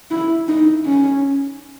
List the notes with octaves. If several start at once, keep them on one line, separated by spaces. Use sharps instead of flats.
E4
D#4
C#4